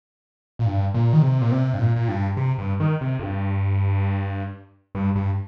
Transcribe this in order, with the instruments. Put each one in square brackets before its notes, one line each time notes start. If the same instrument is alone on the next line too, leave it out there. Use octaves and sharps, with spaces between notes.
[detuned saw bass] A#2
G2
A#2
D#3
C3
A#2
C3
G2
A#2
A#2
G2
C3
G2
D#3
C3
F2
G2
G2
G2